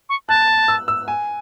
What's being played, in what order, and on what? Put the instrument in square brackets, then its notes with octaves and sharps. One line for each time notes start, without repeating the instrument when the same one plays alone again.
[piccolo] C#6
[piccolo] A5 [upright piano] F#6
[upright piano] E6
E6
G#5